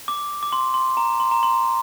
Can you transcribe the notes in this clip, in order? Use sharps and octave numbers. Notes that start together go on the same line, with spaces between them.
D6
D6
C6
C6
A#5
C6
A#5
C6